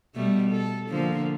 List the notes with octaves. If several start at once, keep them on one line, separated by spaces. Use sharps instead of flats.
B2 G3 A3
A4
D3 F3 A#3